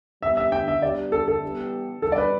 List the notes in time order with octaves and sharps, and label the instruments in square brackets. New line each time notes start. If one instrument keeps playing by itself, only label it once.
[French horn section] E3 G3 B3 G4 [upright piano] E5
[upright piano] E5
G5
E5
[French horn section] G3 B3 D4 G4 [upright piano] D5
[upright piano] A4
A4
[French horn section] E3 G3 B3 G4
[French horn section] E3 G3 D4 [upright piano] A4
[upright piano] D5
B4